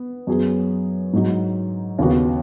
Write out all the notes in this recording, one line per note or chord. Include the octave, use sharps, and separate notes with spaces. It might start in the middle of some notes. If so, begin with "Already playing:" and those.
Already playing: B3
F#2 F#3 B3 G#4
G#2 F#3 D#4
D#2 C#3 B3 F#4